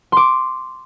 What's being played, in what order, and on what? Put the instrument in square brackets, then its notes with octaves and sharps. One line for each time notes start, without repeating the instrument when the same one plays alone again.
[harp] C6 D6